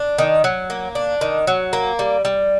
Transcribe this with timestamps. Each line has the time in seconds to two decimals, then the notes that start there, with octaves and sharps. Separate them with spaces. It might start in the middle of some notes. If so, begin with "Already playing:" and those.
Already playing: D4
0.18 D#3
0.44 F#3
0.70 A#3
0.95 D4
1.21 D#3
1.47 F#3
1.73 A#3
1.99 G3
2.25 G3